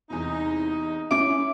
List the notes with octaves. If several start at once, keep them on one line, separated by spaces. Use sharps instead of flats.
E2 C3 D#4
C#4 E4 D6